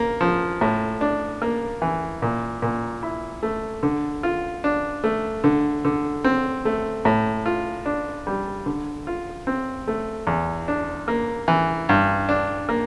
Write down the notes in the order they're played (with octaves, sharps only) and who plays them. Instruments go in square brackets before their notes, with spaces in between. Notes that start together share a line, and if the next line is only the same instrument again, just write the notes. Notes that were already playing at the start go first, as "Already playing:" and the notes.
Already playing: [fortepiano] A#3
F3
A2
D4
A#3
E3
A#2
A#2
E4
A3
D3
F4
D4
A3
D3
D3
C4
A3
A2
F4
D4
G3
D3
F4
C4
A3
E2
D4
A#3
E3
G2
D4
A#3